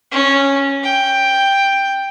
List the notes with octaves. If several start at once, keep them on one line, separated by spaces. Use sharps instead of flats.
C#4
G5